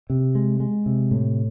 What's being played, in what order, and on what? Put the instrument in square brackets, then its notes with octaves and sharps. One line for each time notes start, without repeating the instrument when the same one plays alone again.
[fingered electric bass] C3
G#3
G#3
C3
A2